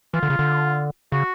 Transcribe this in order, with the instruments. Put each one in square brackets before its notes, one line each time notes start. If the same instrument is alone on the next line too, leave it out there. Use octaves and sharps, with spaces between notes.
[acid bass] E3 [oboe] F4
[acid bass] D3
C#3
D3
[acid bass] C#3 [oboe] F#4